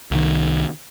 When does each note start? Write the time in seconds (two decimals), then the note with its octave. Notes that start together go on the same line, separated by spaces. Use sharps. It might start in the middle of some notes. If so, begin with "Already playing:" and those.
0.11 C2 D#3